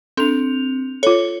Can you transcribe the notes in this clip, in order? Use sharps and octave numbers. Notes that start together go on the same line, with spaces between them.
C4 D4 A4 F7
F4 A4 C#5